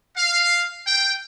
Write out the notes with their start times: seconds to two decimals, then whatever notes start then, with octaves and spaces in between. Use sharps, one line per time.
0.17 F5
0.87 G5